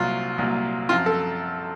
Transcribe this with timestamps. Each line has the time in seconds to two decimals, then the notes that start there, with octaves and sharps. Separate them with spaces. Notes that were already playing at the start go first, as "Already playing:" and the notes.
Already playing: C2 A#2 F#3 F4
0.38 C2 A#2 F#3
0.89 F#2 F3 C4 F4
1.06 A4